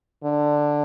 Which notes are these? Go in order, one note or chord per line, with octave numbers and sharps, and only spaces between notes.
D3